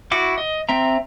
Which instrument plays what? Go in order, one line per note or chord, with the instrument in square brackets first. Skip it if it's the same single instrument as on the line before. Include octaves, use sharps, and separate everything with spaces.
[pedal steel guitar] E4 F#4 D6
D#5
C4 E5 A#5